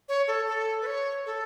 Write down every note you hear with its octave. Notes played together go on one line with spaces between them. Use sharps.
C#5
A4
A4
B4
C#5
A4